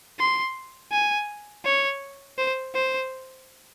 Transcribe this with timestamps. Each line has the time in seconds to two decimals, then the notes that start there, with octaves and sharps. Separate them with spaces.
0.20 C6
0.92 G#5
1.65 C#5
2.38 C5
2.74 C5